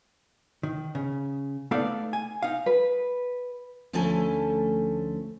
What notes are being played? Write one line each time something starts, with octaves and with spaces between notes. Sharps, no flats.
D#3
C#3
A3 B3 D#4 A4 D5 F5
G#5
D#4 F5
B4
D2 F3 A3 C#4 A4 G#5